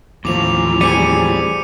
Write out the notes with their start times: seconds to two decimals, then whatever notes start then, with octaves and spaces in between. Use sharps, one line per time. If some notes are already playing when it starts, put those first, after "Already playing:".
0.25 D#2 A2 E3 F3 D6 F7
0.81 G3 C4 G#4 D6 C#7 D#7